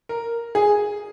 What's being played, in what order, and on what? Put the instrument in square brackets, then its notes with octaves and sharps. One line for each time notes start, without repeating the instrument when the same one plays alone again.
[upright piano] A#4
G#4